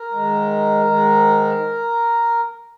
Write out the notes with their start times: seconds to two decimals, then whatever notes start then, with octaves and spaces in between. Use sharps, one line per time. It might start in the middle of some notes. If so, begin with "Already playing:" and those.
Already playing: A#4
0.12 G#2 D#3 G#3
0.84 G#2 D#3 G#3